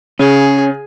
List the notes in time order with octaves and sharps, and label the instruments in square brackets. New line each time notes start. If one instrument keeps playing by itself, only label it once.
[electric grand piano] C#3 [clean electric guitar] C#4 [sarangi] G#4